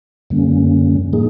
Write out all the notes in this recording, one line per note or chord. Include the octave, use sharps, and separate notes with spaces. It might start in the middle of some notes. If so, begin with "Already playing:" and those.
F#2 D3 G3 A#3 C#4
A2 F3 A#3 D#4 G#4